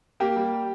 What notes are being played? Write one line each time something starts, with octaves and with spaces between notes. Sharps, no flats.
A#3 G4
G3